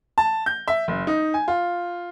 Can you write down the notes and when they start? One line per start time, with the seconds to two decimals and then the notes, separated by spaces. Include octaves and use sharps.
0.18 A5
0.46 G6
0.68 E5
0.88 F#1
1.07 D#4
1.34 G#5
1.48 F4